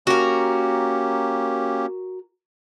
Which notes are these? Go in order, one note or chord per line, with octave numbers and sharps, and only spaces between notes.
A#3 C#4 F#4 G4 A#4